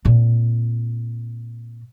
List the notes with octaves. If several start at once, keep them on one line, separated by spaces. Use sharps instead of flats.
A#2 C4